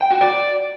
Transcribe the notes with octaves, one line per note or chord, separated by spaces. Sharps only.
G5
F#4
D5